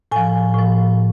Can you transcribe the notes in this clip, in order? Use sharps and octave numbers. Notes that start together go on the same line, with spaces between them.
A2 F3 G#5
A2 F3